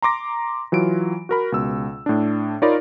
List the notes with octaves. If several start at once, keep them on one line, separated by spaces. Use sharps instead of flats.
A#5 C6 D6 A#6
E3 F#3 F4 D7
F#4 A#4 B5
C#2 B2 E6
A2 D4
D#4 F4 A#4 C#5 D5 B5